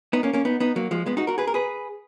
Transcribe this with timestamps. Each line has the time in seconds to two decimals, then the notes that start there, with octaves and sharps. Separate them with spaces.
0.13 B3 D#4
0.23 A#3 C#4
0.33 A#3 C#4
0.45 B3 D#4
0.60 B3 D#4
0.76 F#3 A#3
0.91 F3 G#3
1.06 G#3 B3
1.17 D#4 F#4
1.27 F#4 A#4
1.38 G#4 B4
1.47 A#4
1.54 G#4 B4